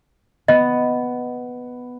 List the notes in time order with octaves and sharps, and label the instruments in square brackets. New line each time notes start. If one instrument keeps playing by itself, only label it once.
[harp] B3 [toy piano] D#5